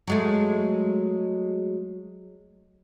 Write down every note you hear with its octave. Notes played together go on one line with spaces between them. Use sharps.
F#3 G#3 A3